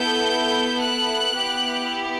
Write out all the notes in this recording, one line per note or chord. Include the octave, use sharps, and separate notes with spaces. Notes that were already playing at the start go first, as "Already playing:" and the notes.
Already playing: B3 E4 A4 G6
F#6
B3 E4 G4